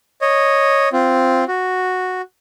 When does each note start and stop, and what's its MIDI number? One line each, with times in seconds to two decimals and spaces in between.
0.21 0.89 73
0.21 0.89 75
0.93 1.44 60
0.93 1.44 65
1.48 2.22 66